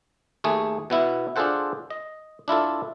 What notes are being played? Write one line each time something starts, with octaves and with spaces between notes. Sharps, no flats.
D#2 A3 G#4
B2 B3 E4
D4 F4 G#4 A4 C5 F#5
D#5
D4 E4 F4 A4